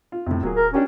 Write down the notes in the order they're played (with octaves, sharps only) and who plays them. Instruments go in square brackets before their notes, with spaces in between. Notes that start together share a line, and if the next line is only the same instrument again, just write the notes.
[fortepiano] F4
[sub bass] F2 [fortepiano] A2 C3
[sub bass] D1 [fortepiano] F#3 A#3 G#4
[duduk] A#4
[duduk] C#4 [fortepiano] D4 G4 A#4